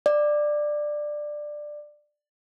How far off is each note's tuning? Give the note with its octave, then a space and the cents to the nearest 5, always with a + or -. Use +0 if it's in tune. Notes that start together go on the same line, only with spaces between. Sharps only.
D5 +15